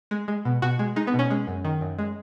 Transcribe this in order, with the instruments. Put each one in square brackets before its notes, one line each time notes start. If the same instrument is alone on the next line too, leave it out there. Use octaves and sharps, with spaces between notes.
[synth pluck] G#3
G#3
B2
B2 F#4
G#3
G#3 D#4
B3
B2
C#4
G#3
F#2
D#3
F#2
G#3